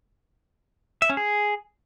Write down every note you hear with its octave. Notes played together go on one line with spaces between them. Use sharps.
E5
C#4
G#4